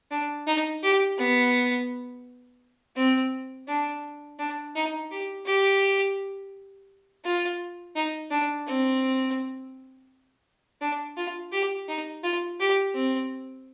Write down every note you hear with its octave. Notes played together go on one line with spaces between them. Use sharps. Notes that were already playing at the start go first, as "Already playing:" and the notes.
D4
D#4
G4
B3
C4
D4
D4
D#4
G4
G4
F4
D#4
D4
C4
D4
F4
G4
D#4
F4
G4
C4